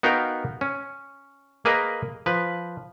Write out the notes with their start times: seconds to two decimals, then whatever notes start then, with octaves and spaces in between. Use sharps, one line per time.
0.03 B3 D#4 F#4 A#4 F5 G5
0.61 C#4
1.65 A#3 G#4 A#4 B4 D#5
2.26 F3 B4